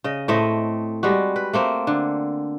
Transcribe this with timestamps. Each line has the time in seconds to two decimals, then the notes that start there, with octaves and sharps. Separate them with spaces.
0.04 C#3 D#5
0.28 A2 A3 C4 D#5
1.03 G3 G#3 F#4
1.36 B4
1.53 A3 A#3 C4
1.87 D3